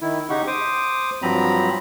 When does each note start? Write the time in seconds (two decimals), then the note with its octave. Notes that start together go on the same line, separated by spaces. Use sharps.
0.01 D#3 E4
0.30 C#3 D#4 G4 F#5 C#6
0.47 C5 D6 D#6
1.22 G2 F3 F#3 C4 A#5 B5